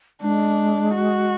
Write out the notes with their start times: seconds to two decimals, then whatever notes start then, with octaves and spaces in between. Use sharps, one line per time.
0.22 G#3 D4
0.95 F#4